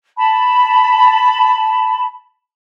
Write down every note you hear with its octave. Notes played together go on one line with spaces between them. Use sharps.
A5 B5